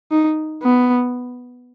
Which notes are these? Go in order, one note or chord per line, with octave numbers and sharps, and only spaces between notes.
D#4
B3